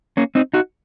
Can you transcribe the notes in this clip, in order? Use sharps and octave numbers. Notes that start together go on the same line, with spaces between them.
A#3 C#4
C4 D#4
D#4 F#4